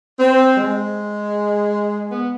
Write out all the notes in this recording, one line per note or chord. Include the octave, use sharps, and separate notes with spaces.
C4
G#3
B3